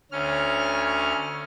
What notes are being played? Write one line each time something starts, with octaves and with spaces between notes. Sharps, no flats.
D2 C#4 F6